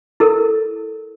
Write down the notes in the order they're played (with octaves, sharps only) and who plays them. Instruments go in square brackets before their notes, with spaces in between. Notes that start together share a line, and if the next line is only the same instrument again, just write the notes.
[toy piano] E4 A4 A#4